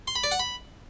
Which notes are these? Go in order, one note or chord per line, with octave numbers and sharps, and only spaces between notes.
C6
B5
D5
F#5
B5